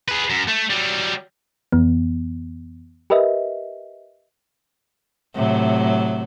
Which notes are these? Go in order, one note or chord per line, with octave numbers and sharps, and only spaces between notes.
G#4 B4
F#2
A3
F#3 G3
F2 E3 B3
G4 A#4 B4 D#5 E5
A2 C3 F#3